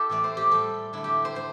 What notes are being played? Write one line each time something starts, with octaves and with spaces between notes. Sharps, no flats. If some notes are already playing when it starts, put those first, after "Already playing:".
Already playing: E4 G4 A4
A2 E3 A3 D5
C5
G4
A2 G3 A4
D3 A3 E4
G4
C5
A3 C5